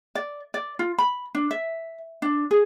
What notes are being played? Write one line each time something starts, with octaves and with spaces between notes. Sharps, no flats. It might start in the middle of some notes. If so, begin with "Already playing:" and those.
D5
D5
F4
B5
D4
E5
D4
G#4